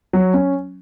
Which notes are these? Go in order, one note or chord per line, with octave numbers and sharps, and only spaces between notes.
F#3
C#4